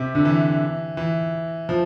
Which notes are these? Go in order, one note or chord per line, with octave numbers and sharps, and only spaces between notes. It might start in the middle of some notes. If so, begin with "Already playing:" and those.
Already playing: C3
D3
E3
E3
F3